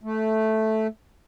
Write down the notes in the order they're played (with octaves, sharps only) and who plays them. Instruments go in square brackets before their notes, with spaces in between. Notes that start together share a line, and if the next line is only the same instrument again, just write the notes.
[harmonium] A3